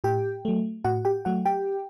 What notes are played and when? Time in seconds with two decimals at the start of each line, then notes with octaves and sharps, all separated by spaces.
0.04 A2 G4 G5
0.45 F#3 A3
0.84 A2 F#4 F#5
1.05 G4 G5
1.25 F#3 A3 F#4 F#5
1.45 G4 G5